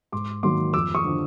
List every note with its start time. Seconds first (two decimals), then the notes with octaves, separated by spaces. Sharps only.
0.12 G#2 C6 D6
0.43 D#3 F#3 A#3 C6 D6
0.74 F2 D6 E6
0.95 C#6 D#6
1.04 D3 F3